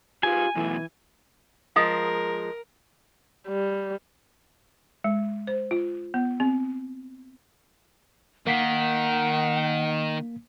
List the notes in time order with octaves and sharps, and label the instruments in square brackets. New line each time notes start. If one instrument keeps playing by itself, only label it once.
[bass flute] F4 [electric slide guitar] G4 G#4 B4 [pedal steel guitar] G#5
[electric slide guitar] F#2 B2 A3 [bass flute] E3
[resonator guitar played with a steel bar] F3 G#3 [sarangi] A#4 [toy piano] F5 D#6
[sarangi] G3
[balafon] G#3
C5
F4
B3
C4
[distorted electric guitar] D#3 [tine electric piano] A#3 B6 C7 [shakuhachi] F#5